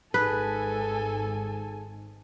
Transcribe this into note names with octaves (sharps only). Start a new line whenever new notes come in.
G#1 G#2 D#4 G#4 A4 B4 G#5 A5